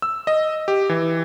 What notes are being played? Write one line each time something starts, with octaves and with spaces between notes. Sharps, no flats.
E6
D#5
G4
E3